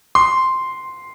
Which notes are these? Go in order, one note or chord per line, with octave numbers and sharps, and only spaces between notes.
C6